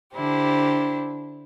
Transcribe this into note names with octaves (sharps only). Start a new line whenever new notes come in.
D3 D4 E4 G4 C5